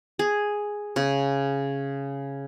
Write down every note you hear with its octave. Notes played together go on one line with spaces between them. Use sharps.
G#4
C#3